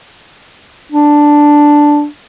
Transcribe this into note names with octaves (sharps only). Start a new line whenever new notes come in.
D4